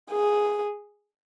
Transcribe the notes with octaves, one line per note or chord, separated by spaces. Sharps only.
G#4